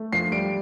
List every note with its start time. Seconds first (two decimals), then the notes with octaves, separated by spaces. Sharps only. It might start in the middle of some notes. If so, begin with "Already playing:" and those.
Already playing: A3
0.13 F3 C7
0.32 G3 D7